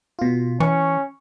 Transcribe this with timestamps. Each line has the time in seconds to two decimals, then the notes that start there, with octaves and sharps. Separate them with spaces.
0.19 B2 F4
0.60 E3 C#4 C#6